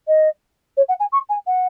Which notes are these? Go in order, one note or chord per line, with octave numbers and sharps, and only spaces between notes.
D#5
C#5
F#5
G#5
C#6
G#5
F#5